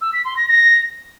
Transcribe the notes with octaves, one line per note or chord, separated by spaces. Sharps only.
E6
B6
C6
A#6
A#6